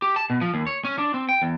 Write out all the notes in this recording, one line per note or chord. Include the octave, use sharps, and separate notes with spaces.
G4
A5
B2
F3
D#2
C#5
C#4
D4
C4
G5
E2